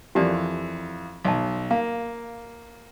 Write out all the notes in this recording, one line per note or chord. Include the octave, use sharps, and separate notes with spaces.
F2 E3 G4 A#4 D5
B1 D#5 A5
A#3 F5